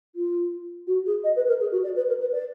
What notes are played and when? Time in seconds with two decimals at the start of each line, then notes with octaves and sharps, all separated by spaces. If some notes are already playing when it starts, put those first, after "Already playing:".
0.15 F4
0.87 F#4
1.06 G#4
1.23 D#5
1.36 B4
1.47 A#4
1.60 G#4
1.71 F#4
1.83 D5
1.95 B4
2.08 A#4
2.20 B4
2.32 D5